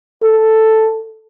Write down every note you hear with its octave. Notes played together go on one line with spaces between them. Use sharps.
A4